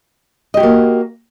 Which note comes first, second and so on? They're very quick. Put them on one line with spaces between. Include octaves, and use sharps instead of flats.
D#5 G4 F#4 A#3